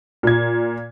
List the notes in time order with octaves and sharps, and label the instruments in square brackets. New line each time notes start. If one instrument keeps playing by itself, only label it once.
[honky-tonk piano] A#2 G#6